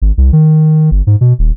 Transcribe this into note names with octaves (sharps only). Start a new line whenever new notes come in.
G#1
C2
D#3
G1
G#2
B2
D#1